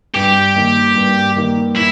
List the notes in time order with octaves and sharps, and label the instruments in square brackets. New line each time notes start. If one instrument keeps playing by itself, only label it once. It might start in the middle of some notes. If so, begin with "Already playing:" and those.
[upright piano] G2 [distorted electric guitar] G4
[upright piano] D#3 A#3
G2
D#3 A#3
[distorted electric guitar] E4